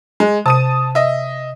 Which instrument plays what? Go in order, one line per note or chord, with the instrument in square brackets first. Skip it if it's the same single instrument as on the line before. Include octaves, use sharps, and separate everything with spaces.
[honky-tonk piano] G#3
[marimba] C3 [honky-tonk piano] A5 D#6 D#7
[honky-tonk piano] D#5 E5